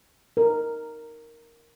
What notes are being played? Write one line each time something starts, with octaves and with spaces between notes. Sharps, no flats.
A#4